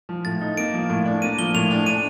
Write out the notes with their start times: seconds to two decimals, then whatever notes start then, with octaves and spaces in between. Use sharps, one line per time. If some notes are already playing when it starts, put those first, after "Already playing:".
0.09 F3
0.25 A2 A6
0.41 D#4
0.57 A#3 D7
0.74 F3
0.90 A2
1.05 D4
1.22 A#3 D#7
1.39 F3 G7
1.54 A2 F7
1.71 D4
1.86 D4 D#7